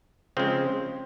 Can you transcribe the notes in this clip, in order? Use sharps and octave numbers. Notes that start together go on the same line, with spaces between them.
C#3 F3 G#3 C4